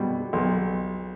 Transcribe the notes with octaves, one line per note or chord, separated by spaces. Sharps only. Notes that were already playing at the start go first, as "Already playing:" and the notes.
Already playing: B2 G3
B1